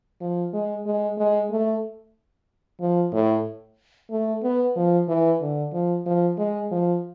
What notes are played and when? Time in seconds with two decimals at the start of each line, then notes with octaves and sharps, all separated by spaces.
0.21 F3
0.53 G#3
0.86 G#3
1.18 G#3
1.51 A3
2.81 F3
3.13 A2
4.11 A3
4.43 B3
4.76 F3
5.09 E3
5.41 D3
5.73 F3
6.06 F3
6.38 G#3
6.71 F3